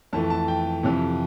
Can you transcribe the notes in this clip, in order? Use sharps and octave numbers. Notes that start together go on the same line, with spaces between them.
F2 E3 A3 A5
A5
G5
F2 C3 E3